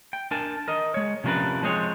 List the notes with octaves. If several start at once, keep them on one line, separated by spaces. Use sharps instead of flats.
G5
D4 A#4 G#5 A5
A#4 D#5
G#3 C#5
C3 F3 C#4 D4 A#4 B4
F3 G#3 C4 G#4 C#5